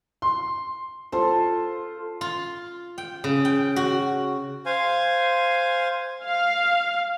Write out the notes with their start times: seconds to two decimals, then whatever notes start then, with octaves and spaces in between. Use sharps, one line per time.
0.22 C6
1.12 F4 A4 C5
2.21 F4
2.98 G5
3.24 C#3
3.45 G5
3.76 F#4
4.66 C5 F5 G#5 C6
6.23 F5